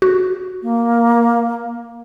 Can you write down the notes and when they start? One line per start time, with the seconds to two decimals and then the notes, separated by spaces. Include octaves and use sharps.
0.02 F#4
0.63 A#3